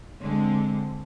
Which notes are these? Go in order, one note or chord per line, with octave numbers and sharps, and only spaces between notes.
D3 G#3 C4